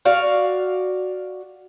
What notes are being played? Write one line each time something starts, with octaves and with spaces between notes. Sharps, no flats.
F#4 D5 F5